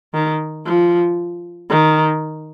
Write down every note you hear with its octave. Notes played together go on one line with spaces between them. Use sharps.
D#3
F3
D#3